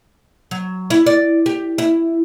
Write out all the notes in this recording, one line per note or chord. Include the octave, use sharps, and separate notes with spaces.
F#3
E4
D5
G4
E4